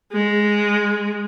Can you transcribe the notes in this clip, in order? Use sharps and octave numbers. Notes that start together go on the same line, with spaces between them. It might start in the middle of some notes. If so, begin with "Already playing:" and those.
G#3